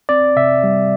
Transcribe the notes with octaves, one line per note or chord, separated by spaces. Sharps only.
C4 D5
C3 E5
G3